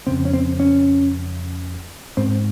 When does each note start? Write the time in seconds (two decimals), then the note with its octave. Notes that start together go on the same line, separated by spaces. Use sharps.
0.07 F2 C#3 C4
0.25 C#4
0.34 C4
0.60 C#4
2.17 G#2 C4